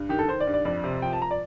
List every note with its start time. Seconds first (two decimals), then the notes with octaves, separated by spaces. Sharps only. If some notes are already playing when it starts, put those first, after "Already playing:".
Already playing: G2
0.09 D#3 G4
0.19 A4
0.28 D#3 C5
0.40 D5
0.47 G2
0.54 D5
0.65 F2 D5
0.84 C3
1.02 F3 G5
1.13 A5
1.22 A#5
1.31 D5